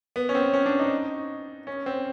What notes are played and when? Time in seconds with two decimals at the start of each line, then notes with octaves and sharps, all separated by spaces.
0.16 B3
0.29 C#4
0.35 C4
0.54 C#4
0.66 D4
0.79 D#4
1.67 C#4
1.86 C4